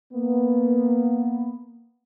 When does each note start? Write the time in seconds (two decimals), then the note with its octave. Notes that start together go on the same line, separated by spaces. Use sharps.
0.14 A#3 B3